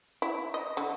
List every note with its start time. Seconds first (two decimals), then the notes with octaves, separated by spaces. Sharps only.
0.22 E4
0.54 D#5
0.77 D3